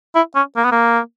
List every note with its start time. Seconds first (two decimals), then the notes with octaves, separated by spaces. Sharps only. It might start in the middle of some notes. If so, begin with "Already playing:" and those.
0.15 E4
0.36 C#4
0.57 A#3
0.65 B3
0.72 A#3